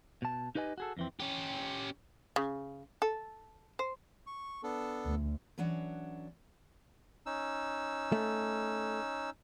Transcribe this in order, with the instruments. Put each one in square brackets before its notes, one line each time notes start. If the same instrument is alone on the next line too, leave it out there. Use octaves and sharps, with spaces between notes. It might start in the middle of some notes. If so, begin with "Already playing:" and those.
[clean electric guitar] B2 A5
D#4 G4 B4 D#5 G#5
F#4 G#4 A4
F2 E3 C4
[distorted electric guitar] C#4 G4
[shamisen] C#3
A4
C5
[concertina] C#6
B3 D4 A4
[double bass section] D2
[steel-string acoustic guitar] E3 F#3 C#4 D4 C#5 F#5
[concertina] C#4 D#4 E6
[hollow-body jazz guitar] A3